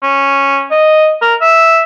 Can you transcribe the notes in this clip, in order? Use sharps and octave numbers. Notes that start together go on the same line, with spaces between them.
C#4
D#5
A#4
E5